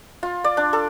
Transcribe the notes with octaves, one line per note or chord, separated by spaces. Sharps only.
F4
D5
D4
A4